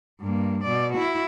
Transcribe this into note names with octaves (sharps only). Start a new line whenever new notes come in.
G2 A#3
B2 D5
E4 F#4